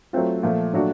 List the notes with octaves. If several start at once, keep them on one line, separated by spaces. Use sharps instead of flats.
F#3 A3 C4 F4
A#2 F3 A3
A#2 F#3 A3 D4 F#4